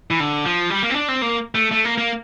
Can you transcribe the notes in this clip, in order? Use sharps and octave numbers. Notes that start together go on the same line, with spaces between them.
E3
D3
F3
G3
A#3
C4
D4
C4
A#3
A3
A3
A#3
A#3